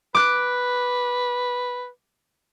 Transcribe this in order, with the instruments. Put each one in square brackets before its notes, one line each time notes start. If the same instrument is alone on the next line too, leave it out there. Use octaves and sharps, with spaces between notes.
[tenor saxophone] B4 [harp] D6 F#6